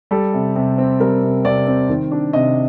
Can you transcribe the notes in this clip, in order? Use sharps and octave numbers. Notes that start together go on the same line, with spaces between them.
G3 A4
C3
C3
C4
G3 A#4
C3
C3 D5
C4
D#3
D4
C3 D#5